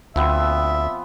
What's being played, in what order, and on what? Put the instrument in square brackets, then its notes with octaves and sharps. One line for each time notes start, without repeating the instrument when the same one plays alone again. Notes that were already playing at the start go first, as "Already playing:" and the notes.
[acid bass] D2 [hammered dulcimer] F3 B3 C4 [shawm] E5